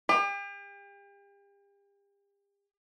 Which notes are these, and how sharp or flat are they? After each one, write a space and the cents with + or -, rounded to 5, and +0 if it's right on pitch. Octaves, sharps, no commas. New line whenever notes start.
G4 +40